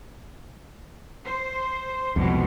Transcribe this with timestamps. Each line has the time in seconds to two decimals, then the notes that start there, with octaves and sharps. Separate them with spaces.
1.25 C5
2.16 C2 F2 B2 G3 G#3